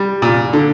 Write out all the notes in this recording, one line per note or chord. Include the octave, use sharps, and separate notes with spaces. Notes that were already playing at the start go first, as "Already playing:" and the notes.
Already playing: G3
A#2
D3